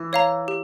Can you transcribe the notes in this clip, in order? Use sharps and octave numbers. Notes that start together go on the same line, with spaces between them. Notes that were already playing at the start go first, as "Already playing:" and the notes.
Already playing: E3
C#5 F5 A#5
G4